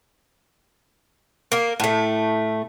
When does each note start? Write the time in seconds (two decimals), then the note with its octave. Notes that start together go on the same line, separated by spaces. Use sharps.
1.52 A#3 A#4
1.80 A2 A3